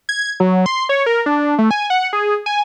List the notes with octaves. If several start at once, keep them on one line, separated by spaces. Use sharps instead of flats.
G#6
F#3
C6
C#5
A#4
D4
A3
G#5
F#5
G#4
G#5